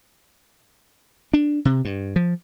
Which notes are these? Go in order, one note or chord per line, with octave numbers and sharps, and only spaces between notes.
D4
C3
G2
F3